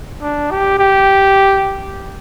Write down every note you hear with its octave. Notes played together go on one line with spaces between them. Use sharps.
D4
G4
G4